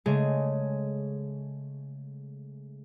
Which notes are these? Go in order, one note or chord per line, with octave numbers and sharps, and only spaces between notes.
C#3 G#3 A3 G#4